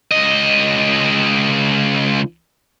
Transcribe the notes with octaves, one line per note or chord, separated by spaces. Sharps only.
C#2 D#5